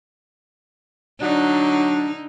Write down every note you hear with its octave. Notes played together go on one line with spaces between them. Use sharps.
D3 F#3 D4 D#4